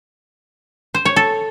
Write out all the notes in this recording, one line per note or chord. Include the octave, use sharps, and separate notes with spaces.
C5
C#5
A4